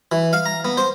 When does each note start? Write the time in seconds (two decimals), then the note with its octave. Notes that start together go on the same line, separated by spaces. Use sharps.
0.12 E3
0.33 F5
0.46 A#5
0.65 B3
0.77 C5